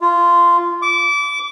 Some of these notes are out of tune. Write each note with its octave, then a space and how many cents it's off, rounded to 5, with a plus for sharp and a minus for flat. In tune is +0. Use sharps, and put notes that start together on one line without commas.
F4 -15
D6 -25